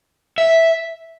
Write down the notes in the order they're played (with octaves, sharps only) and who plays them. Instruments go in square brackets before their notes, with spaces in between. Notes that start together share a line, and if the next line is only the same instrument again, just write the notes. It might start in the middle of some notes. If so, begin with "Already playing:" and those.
[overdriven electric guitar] E5